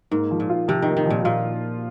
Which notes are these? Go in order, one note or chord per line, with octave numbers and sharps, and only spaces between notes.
G#2 A#3
F3
A#2
F4
C3 F3
D#3 A#3
D#3
A#2 F3
A#2 F4